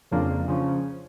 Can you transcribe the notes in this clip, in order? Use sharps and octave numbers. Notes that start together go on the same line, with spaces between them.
F2 C#3 F3 A#3 D4
C#3 F3 C#4